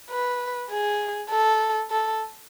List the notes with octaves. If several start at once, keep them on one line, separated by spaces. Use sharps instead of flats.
B4
G#4
A4
A4